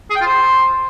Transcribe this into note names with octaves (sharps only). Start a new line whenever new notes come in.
G#4
G5
F4
C5